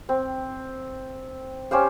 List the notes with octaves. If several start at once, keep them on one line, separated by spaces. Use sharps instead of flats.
C4
C#4 G4 C5 F5